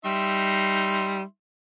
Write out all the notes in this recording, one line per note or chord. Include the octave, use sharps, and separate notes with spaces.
G3 D#4 E5 C6